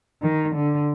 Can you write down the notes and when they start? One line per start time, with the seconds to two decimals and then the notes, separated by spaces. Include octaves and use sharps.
0.22 D#3
0.56 D3